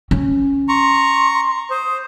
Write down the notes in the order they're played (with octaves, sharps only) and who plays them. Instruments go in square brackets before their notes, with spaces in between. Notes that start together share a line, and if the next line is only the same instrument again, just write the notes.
[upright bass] C#4
[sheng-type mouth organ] A#5 C#6 [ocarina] C6
[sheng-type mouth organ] C5 [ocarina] D#6